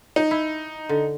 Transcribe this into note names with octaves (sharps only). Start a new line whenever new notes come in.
D#4
E4
D3